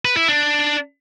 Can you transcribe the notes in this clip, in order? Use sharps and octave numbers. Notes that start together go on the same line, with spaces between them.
B4
E4
D4